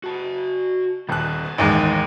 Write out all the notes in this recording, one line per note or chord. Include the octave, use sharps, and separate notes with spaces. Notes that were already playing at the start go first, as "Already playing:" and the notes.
F#4 A5
D#1 B3 A5 F#6
A1 D#2 G#3